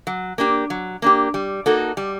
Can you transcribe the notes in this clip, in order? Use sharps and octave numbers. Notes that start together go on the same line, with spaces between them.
F#3
A#3 D4 G4
F#3
A#3 D4 G4
G3
A#3 D#4 F#4 A4
G3